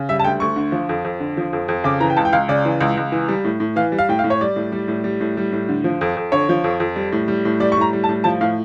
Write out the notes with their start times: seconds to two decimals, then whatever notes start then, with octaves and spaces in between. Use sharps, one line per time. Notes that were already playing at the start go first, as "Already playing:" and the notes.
Already playing: C#3
0.09 G3 E5
0.19 A5
0.24 D2 G5
0.40 D2 C#6
0.56 D3
0.72 F3
0.89 F2
1.04 F2
1.20 D3
1.37 F3
1.53 F2
1.68 F2
1.84 C#3 D6
2.00 E3 A#5
2.10 G5
2.16 C#2 A5
2.25 G5
2.33 C#2 F5
2.48 C#3 D5
2.65 E3
2.81 C#2
2.97 C#2
3.12 E3
3.28 G3
3.44 A2
3.60 A2
3.76 E3 F5
3.92 G3
3.98 F5
4.09 A2 G5
4.19 F5
4.24 A2
4.30 C#5
4.41 G3 D5
4.56 A2
4.72 G3
4.88 A2
5.04 G3
5.20 A2
5.37 G3
5.52 A2
5.69 D3
5.84 F3
6.01 F2
6.17 F2
6.32 D3 C#5
6.49 F3
6.64 F2
6.80 F2
6.96 G3
7.12 A2
7.28 G3
7.45 A2
7.60 G3 D5
7.72 C#6
7.77 A2 A#5
7.93 G3
8.04 A5
8.09 A2
8.24 F3 A5
8.41 A2 F5